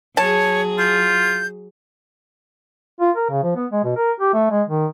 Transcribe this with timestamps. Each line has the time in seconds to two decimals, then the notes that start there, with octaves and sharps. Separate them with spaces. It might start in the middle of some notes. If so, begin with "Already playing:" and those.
0.17 F#3 G#4 C#5 A5
0.79 F4 G6
3.00 F4
3.16 A#4
3.30 C#3
3.43 F3
3.56 B3
3.71 G#3
3.84 B2
3.96 A#4
4.20 G4
4.33 A3
4.51 G#3
4.68 D#3